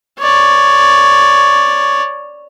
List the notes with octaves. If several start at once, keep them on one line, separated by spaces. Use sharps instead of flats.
C#5 D5